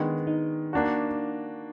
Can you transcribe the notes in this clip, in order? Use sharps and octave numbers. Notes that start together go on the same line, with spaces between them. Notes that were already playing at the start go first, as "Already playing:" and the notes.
Already playing: D#3 G#3 B3 D4
D#4
A#3 D4 F#4